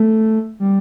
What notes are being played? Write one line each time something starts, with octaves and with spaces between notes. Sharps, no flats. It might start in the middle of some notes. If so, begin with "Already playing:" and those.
Already playing: A3
G3